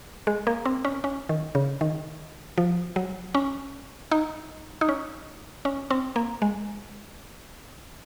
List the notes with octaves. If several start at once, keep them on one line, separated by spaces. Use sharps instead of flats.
G#3
A#3
C4
C#4
C#4
D#3
C#3
D#3
F3
F#3
C#4
D#4
D#4
C#4
C#4
C4
A#3
G#3